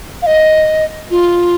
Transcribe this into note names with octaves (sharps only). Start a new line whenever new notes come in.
F5
D#5
F4